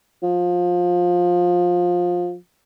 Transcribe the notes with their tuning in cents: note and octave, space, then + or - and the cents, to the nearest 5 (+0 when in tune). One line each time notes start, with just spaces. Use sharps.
F3 +20